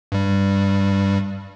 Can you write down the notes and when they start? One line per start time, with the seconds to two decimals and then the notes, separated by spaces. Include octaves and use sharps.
0.12 G2 G3